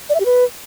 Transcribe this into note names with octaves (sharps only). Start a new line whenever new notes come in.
D5
E5
G4
B4